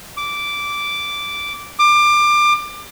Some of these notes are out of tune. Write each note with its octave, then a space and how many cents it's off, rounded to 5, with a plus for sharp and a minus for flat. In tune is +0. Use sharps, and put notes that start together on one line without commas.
D6 -10
D6 +25